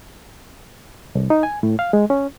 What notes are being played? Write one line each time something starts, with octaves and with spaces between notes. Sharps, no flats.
C2
D#4
G#5
A2
F5
G#3
C#4